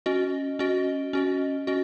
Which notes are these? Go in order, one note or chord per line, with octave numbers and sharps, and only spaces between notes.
C#4 F#4 D#5
C#4 F#4 D#5
C#4 F#4 D#5
C#4 F#4 D#5